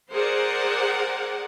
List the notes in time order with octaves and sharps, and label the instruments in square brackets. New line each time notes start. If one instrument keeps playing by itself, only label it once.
[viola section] G#4 A#4 C5 D5 F#5